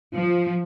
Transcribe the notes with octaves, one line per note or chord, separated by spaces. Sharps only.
F3